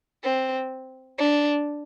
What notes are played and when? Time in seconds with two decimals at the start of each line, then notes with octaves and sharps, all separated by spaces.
0.24 C4
1.18 D4